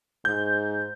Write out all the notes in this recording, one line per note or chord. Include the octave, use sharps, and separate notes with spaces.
G#2 G6